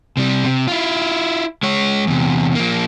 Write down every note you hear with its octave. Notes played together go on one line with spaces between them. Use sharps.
C3 G3
C3
E4 F4
G#3 C#5
E2 C3
F3 A#3